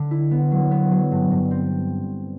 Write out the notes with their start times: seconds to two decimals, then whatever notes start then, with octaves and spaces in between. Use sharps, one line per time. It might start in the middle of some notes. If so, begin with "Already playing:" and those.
Already playing: D3
0.11 E4
0.31 B3
0.51 F#3
0.71 B3
0.91 F#3
1.12 G2
1.31 G2
1.51 C4